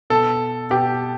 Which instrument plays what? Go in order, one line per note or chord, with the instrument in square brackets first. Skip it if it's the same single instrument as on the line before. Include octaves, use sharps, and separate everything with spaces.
[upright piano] B2 A4
B2 G4